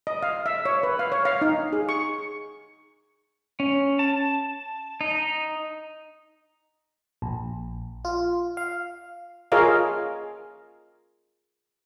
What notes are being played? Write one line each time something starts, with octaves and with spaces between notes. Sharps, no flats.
D#5
F5
E5
C#5
B4
F5
C#5
F5
D#4
G#4
C#6
C#4
A5
D#4
A#1
F4
F5
F4 G#4 A#4 C#5 D#5 F5